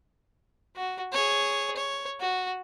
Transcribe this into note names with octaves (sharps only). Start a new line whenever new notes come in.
F#4
G#4 C#5
C#5
F#4